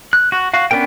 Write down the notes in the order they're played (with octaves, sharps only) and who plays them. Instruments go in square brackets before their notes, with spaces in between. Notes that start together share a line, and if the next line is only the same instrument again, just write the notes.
[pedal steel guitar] F#6
F#4
F#4 F5
B3 C#4 D4 A#4 G5